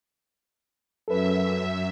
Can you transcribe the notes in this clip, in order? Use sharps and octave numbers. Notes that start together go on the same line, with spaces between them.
F#2 A4 B4 E5